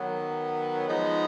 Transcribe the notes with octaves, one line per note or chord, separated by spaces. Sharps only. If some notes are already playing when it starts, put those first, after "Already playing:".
Already playing: D#3 F#3 B3
F3 G#3 B3 D#4